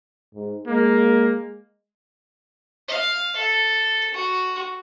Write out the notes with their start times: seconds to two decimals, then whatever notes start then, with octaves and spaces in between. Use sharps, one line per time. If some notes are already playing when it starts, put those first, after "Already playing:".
0.34 G#2
0.67 G#3 A#3
2.88 F5
3.36 A4
4.14 F#4